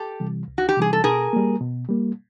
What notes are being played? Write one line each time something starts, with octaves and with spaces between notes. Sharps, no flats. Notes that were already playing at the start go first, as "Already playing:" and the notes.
Already playing: G4 A4
C3 E3 G3
C2
F#4
G4
C3 E3 G3 G#4
A4
B2 G#4 A#4
G3 A#3
B2
G3 A#3